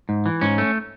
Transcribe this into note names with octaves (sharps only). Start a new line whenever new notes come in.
G#2
E3
G#2 C#4
A3